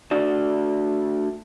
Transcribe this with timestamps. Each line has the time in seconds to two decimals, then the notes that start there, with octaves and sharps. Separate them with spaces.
0.11 A3 D4 F#4 D5